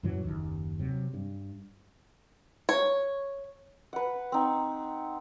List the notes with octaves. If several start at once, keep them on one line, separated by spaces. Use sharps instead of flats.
F#2 A#2 E3 F#3
F#1 D#2
C3 F#3
G2
C#5
B4 F#5
C4 D#4